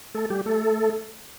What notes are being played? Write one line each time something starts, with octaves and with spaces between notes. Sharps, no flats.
A3 A4
G3 G4
A3 A4